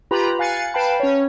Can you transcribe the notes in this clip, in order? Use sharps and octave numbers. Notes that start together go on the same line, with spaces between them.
F4 G4 B4 A#5 B5
F5 G#5 F#6 A6 C#7
B4 F5 G5 A5 B5
C#4 C#5